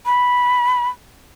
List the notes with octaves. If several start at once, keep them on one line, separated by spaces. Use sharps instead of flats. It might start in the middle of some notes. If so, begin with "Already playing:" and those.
B5